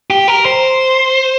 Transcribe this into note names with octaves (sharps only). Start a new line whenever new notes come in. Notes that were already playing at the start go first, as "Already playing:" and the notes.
G4
A#4
C5